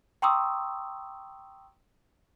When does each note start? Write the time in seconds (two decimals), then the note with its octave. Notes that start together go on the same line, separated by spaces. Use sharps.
0.22 G5 A#5 C6 C#6 D#6 E6